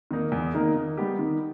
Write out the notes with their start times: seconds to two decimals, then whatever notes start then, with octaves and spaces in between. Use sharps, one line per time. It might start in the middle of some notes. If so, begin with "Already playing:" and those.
0.11 D#3 A#3 D#4 A#4
0.32 E2
0.54 D#3 A#3 D#4 A#4
0.76 D#3
0.97 G3 B3 G4
1.19 D#3